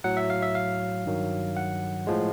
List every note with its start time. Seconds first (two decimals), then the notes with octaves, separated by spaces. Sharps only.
0.04 A2 F#3 F#5
0.17 E5
0.30 F5
0.42 E5
0.55 F5
1.06 G2 D#3 F#3
1.57 F#5
2.07 A2 F3 G#3